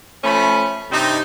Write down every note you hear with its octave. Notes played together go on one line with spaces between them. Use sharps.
F3 A3 C#4 B5
G2 C3 C4 D#4